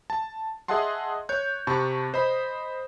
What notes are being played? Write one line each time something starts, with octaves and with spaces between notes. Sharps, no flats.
A5
G#4 D#5 E5 F#5 A5 C6
C#5 F#6 G6
C3 A5 B5 C#6
C5 D#5 B5